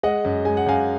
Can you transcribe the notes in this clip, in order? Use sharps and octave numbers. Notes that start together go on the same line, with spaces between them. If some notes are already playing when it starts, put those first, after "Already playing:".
G#3 D#5 F#5
F#2
G#3 G#5
F#5
F#2 F5 G#5